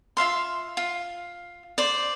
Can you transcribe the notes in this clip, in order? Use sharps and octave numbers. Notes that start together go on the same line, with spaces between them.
F4 E5 F5 C6
F4
C5 D5